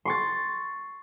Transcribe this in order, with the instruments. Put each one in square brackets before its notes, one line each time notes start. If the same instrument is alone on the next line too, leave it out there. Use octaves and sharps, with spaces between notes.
[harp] C6 C#6 A6